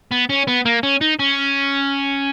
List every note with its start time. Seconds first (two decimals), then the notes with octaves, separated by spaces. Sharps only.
0.12 B3
0.30 C#4
0.48 B3
0.65 A#3
0.83 C#4
1.01 D#4
1.19 C#4